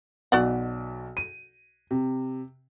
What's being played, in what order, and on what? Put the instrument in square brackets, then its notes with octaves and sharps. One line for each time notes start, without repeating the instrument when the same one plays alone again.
[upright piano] B1 B2 [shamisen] F#4 D5 F#5
[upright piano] D#7
C3